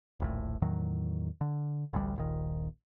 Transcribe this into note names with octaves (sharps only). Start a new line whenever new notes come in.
D#1 A#1 A2
E2 A2 D#3 F#3
D3
A1 D2 G3
D#1 A#1 D#3